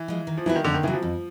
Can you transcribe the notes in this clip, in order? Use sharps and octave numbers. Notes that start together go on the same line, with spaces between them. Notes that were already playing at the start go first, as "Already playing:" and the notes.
Already playing: E3
F3 G#3
D#3
F3
E3 F#3 B3 E4
D#3
F2 D3
D#3
C#3 E3 F#3
F3
F2